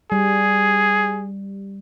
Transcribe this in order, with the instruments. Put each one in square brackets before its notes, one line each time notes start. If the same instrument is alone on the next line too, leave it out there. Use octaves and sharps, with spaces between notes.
[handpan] G3 [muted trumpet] G#4